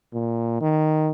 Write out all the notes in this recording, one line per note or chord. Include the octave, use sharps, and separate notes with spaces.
A#2
D#3